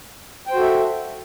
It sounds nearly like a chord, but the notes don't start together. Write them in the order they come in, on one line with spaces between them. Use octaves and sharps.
G5 C5 F#4 A4 E5